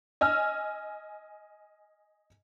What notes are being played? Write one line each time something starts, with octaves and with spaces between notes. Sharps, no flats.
D#5 G#5 E6 F6